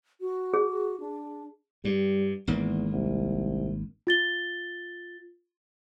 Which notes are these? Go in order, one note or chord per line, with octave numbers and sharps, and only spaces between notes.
F#4
G#4
D4
G2 G3
G#1 E2 G#2 A#3
C2
F4 A6 G7